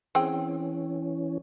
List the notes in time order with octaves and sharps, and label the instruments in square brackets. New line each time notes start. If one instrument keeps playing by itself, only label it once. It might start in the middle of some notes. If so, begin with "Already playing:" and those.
[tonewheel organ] E3 C#4 [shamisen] C4 G#4 G5